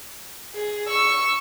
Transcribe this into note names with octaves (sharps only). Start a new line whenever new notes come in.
G#4
C#6 E6